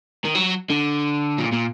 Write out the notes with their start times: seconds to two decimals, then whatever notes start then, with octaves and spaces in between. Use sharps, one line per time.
0.25 D#3
0.35 F#3
0.70 D3
1.40 A#2
1.53 A#2